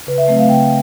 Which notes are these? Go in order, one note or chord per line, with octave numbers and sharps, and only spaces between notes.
C#3 B4
E5
F#3 A3 C4
F5
C#3 G5